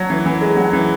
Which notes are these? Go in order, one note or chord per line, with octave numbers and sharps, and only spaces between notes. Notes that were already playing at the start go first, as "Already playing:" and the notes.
Already playing: F#3
E3
E3
G#3
F#3
E3